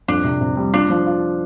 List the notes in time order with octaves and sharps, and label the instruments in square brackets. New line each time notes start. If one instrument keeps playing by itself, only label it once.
[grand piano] F2 [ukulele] D4
[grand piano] C3
C3
G3
[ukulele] D4 [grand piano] F4
[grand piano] F3
F4